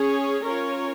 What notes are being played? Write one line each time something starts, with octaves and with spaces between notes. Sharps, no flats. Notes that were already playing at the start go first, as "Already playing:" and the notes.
Already playing: C#4 G#4 C#5
C#4 F4 A#4 C#5